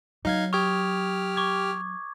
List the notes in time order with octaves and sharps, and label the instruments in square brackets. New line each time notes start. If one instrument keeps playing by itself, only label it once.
[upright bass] F#3 [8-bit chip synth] D#4 F5 G#6
[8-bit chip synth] G4 F6 [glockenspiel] C#6 D#6 G#6
[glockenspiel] C#6 D6 G#6